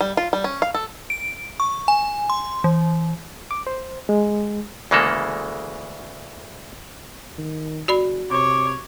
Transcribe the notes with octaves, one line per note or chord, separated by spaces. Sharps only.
G3
F4
G3
C#4
F5
A4
D7
C#6
G#5
C6
E3
D6
C5
G#3
D2 C#3 E3 G#3 A#3 A4
D#3
F#1 F#4 D5 B5
C3 C#5 D6